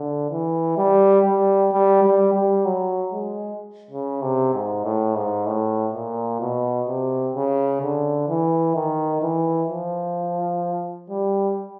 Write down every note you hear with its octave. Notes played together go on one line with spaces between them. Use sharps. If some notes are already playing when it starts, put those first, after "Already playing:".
Already playing: D3
E3
G3
G3
G3
G3
G3
F#3
G#3
C#3
C3
G#2
A2
G#2
A2
A#2
B2
C3
C#3
D3
E3
D#3
E3
F3
G3